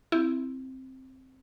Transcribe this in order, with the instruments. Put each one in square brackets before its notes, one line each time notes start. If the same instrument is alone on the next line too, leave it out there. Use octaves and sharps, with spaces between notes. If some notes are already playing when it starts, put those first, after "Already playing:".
[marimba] C4 G6 [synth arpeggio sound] E4